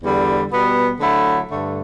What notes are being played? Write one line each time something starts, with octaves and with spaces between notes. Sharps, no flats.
E2 D3 G3
B2 G3 B3
D3 F#3 A3 E4
G2 D3 A3